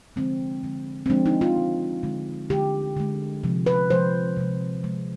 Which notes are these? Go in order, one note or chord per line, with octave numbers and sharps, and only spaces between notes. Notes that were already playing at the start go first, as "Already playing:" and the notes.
D3 F3 G#3 C4
D3 F3 G#3
C4
D3 F3 G#3 D4
D#4
F4
D3 G#3
D3 G#3
D3 G#3 G4
D3 G#3
C3 F3 G#3
B4
C3 F3 G#3 C5
C3 F3 G#3
C3 F3 G#3